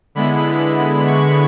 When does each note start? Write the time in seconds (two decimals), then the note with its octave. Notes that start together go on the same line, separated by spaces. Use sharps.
0.15 D3 G#3 B3 E4 B5
0.60 B5
1.07 C#6